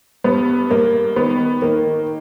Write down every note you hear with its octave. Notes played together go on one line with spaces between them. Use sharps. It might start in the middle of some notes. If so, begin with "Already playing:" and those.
G2 B3
G2 A#3
D#3 B3
D#3 A#3